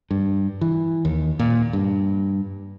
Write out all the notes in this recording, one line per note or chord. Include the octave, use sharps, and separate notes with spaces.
G2
E3
D#2
A#2
G2